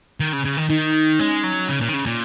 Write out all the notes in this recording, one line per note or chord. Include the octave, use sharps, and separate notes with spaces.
D#3
C#3
C#3
D#3
D#3 D#4
G#3 C#4
F#3
C#3
A#2
D#3
C#3
A#2